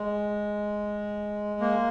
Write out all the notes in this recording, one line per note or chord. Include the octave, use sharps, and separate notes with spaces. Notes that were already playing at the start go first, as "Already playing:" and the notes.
Already playing: G#3
A#3